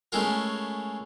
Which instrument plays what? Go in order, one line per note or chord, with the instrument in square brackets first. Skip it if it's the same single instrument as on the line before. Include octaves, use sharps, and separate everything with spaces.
[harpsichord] G#3 A3 C#4 E4 F4 A#4